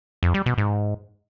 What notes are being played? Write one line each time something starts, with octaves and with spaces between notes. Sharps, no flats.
F2
G3
B2
G#2